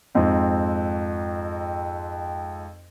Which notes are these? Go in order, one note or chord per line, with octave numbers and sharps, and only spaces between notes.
F2 G#2 C4 D#4